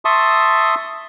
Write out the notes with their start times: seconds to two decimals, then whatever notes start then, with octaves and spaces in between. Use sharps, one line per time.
0.05 E5 A5 C6 C#6 D#6